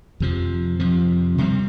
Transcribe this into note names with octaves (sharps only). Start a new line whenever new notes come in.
F2 C3 F3
F2 C3 F3
C3 G3 C4